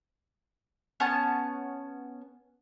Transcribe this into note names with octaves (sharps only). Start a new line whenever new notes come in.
B3 C#4 A5 C#6